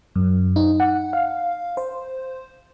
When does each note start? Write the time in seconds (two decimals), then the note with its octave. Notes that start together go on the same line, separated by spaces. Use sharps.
0.16 F#2
0.56 D#4
0.80 F#5
1.13 F5
1.77 C5